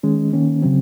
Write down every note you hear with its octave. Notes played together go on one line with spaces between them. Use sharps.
D#3 G#3 C#4
D#3 A#3 C#4
C#3 F#3 C4